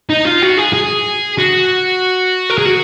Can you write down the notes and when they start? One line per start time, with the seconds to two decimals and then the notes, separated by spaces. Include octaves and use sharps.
0.10 D#4
0.25 F4
0.42 F#4
0.57 G#4
0.73 G#4
1.38 F#4
2.50 A#4
2.58 G#4
2.65 F#4